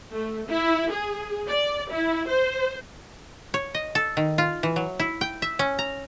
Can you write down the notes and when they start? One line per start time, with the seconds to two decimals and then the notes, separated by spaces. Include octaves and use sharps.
0.12 A3
0.49 E4
0.91 G#4
1.47 D5
1.91 E4
2.28 C5
3.54 C#5
3.74 D#5
3.95 A4
4.17 D#3
4.38 F4
4.63 E3
4.76 F#3
4.99 E4
5.21 G5
5.42 E5
5.59 C#4
5.79 A#5